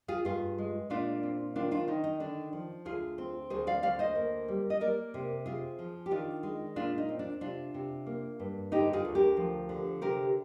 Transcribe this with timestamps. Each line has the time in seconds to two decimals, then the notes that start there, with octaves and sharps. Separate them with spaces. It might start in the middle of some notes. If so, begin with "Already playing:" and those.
0.08 F4 G#4
0.25 G2 F4 G#4
0.58 G#3
0.90 A#2 D4 F4
1.23 C4
1.55 D#3 D4 F4
1.71 D4 F4
1.88 D#3 D#4
2.04 D#4
2.20 D3 D4
2.53 F3
2.85 D2 F4 G#4
3.18 C4
3.50 D2 G#4 C5
3.67 D5 F5
3.83 D2 D5 F5
3.99 C5 D#5
4.15 A#3
4.48 G3
4.70 D#5
4.80 A#3 A#4 D5
5.14 C3
5.46 C4 F4 G#4
5.79 F3
6.06 G4
6.11 D#3 D4 F4
6.43 G#3
6.76 A#2 D4 F4
6.98 D#4
7.09 C4
7.19 D4
7.41 C3 D4 F4
7.74 C3
8.06 A#3
8.39 G2
8.72 D3 D#4 G4
8.93 F4 G#4
9.05 D2
9.15 G4 A#4
9.37 F3
9.69 D3
10.02 C3 G4 A#4